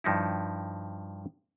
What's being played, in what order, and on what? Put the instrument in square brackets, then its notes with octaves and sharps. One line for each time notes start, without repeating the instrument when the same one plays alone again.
[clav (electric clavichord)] G2 F3 D#4 E4